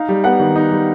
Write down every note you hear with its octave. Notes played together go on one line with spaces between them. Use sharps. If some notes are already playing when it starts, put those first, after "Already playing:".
Already playing: D#4 F5
G3
B3 F#5
D#3
D#4
G3